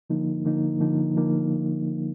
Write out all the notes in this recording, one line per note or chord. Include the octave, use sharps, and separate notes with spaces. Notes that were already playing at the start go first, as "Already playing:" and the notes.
D3 F3 A#3 D#4
D3 F3 A#3 D#4
D3 F3 A#3 D#4
D3 F3 A#3 D#4